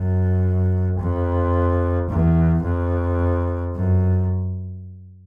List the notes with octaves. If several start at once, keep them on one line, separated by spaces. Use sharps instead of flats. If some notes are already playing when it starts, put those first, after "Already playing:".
Already playing: F#2
F2
E2
F2
F#2